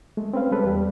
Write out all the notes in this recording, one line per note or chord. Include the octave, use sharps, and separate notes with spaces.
G#3 A3
C4 C#4 B4 F5
G3 G#3 A4 B4
E2 G3